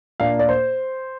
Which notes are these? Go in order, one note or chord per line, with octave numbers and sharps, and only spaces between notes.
A#2 A#3 D4 F5
D5
C5